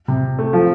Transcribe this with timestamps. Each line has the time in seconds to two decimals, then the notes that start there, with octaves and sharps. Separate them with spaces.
0.08 C3
0.39 A3
0.53 F3